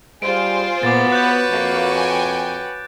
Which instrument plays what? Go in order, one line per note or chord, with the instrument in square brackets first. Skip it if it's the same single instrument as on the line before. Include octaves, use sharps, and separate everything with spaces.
[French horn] G3 [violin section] F4 G#4 C5 [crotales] D7
[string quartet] A#2 [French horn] B3 [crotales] D6 A6
[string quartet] F#4 B4 C#5 [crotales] F#6 G6
[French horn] F2 [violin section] A#3
[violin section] G5 G#5